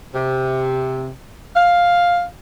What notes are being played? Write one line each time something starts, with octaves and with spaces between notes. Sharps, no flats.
C3
F5